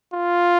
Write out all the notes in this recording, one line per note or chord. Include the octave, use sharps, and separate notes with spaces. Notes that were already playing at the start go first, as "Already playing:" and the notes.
F4